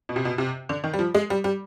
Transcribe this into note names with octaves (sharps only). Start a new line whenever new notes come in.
B2
C3
B2
C3
D3
D#3
G3
F3
G#3
G3
G3